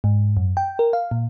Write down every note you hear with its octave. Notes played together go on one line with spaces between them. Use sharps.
G#2
F#2
G5
A#4
F5
A#2